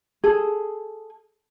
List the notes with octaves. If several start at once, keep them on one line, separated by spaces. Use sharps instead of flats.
G#4 A4